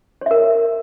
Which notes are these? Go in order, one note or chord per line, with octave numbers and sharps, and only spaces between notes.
A#4 C#5 E5